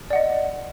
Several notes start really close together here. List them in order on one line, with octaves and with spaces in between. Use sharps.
D5 F#5 D#5